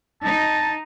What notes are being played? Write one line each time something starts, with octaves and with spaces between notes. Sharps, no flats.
D#4 A5